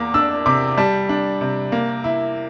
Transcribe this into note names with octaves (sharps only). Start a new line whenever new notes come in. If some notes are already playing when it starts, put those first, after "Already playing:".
Already playing: E2 A#3 D6
D4 E6
C3 D6
G3 A5
D4
C3
A#3
E4